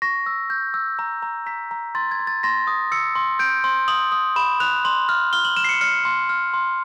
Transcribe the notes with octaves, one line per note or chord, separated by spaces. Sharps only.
C#6 A#6
E6
G6
E6
A#5
A#5
A#5 B6
A#5
C6 A6
G#6
C6
A6
C6 A#6
D#6
E6 C#7
C6
G6 D7
C6
D#6 F#7
D#6
B5 E7
F#6 F7
C6 F#7
F6
F6 G7
F#7
F6 E7
C7
C#7
F6 C#7
C6
F6
C6